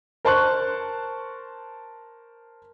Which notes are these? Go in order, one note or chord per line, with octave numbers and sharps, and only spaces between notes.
A#4 C5 A5 C6 C#6 F#6